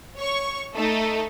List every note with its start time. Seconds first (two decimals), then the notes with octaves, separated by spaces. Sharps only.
0.16 C#5 C#6
0.75 A3 D#4 A4